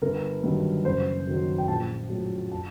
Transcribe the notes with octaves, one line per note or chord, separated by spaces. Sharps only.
G1 A#4
G2 D#3 F#3
F#1 C5
F#2 D#3 F#3
G5
A#1 A5
A2 F#3
A5